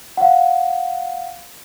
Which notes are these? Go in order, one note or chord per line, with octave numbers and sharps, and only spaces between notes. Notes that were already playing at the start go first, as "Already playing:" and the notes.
F5 F#5